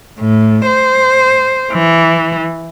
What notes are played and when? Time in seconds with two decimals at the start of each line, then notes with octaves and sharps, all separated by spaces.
0.19 A2
0.66 C5
1.73 E3